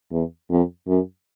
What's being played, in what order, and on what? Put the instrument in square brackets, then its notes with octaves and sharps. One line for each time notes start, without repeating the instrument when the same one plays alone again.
[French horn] E2
F2
F#2